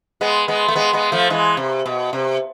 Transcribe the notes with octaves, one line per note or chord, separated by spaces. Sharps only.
G#3 B3
G#3 B3
A3
G#3 B3
G#3 B3
F3 A3
E3 G#3
C3
B2
C3